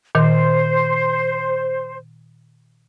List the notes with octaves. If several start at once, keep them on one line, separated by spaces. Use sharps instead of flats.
A#2 D#3 C5